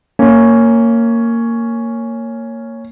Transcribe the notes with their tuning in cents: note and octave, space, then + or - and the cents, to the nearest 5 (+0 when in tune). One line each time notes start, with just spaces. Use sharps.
A#3 -15 C#4 +0